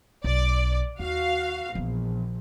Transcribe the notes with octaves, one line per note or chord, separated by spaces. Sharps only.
B1 D5
D#2 F#4 F5
A#1 E3 B3